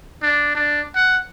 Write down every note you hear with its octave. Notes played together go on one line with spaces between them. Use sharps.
D4
D4
F#5